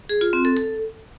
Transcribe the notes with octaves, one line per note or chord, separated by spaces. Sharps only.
G#4
F4
C4
A4
A4